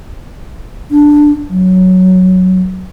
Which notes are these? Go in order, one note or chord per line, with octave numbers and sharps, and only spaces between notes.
D4
F#3